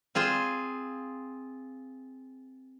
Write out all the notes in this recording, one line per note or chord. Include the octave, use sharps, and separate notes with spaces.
C4 F4 G#4 C5